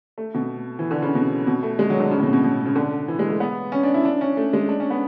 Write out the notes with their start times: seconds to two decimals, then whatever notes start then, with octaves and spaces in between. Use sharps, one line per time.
0.18 A3
0.34 B2
0.79 E3
0.91 D3
1.02 C#3
1.15 B2
1.47 B2
1.63 A3
1.79 G#3
1.90 F#3
2.00 D3
2.11 C#3
2.18 A2
2.23 B2
2.33 B2
2.44 B2
2.66 C#3
2.76 D3
3.08 E3
3.19 G#3
3.30 A3
3.40 B3
3.72 C#4
3.83 D4
3.94 E4
4.05 D4
4.21 C#4
4.37 A3
4.53 G#3
4.69 D4
4.80 C#4
4.90 B3